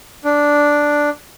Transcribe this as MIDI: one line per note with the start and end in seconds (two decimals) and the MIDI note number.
0.25 1.09 62